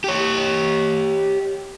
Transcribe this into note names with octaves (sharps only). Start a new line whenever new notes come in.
G4 C#5